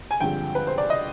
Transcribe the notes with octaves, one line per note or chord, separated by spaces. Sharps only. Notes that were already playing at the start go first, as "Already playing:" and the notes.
G#5
G2 D3 F3 G#3 C4 G5
B4
C5
D5
D#5